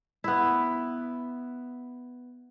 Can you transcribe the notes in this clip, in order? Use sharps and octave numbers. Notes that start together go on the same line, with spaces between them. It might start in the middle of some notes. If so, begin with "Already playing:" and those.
B3 E4